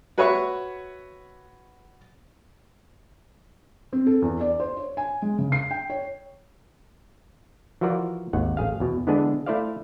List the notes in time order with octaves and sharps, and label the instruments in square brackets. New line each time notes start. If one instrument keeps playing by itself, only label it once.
[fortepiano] F#4 B4 C#5 E5 C#6
[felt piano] C4
A4
E2
D5
C5
C#5
G#5
G#3
C#3
C7
G5
C#5
[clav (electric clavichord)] E3 F3 F4 F#4 A#4 D5
G#1 D#2 F#5
A1 G#4 F5
E2 B2
D3 E3 G#3 B3 D4 G#4
A3 E4 C5 D5 F5